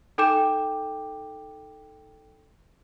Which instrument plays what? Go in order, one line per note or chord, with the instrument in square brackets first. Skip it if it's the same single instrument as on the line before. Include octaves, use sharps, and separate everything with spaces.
[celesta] D#4 A4 G5 D6 G6 E7